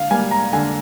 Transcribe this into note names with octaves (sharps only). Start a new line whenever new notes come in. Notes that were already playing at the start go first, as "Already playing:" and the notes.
Already playing: D3 F5
G3 A#3 G#5
A#5
D3 G#5